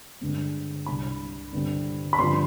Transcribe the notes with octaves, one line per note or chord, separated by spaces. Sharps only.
G2 D3 G#3 C4
C2 C3 G3 D4 B5
G2 D3 G3 C4
B5
G2 D3 F3 C4 C6